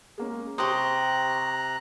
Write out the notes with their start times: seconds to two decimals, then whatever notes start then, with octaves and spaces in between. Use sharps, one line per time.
0.18 G#3 A#3 C#4
0.58 C3 G4 C5 A#5 C#6 D#6 F#6